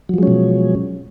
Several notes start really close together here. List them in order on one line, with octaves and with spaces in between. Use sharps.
F#3 F3 G#3 C#4 B2